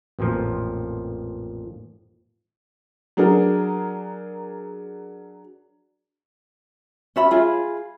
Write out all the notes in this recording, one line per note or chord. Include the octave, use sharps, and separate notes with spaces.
A1 F2 A#2 F3
F#3 D4 G#4 A#4
C#4 E5 B5
F4 G#4 B5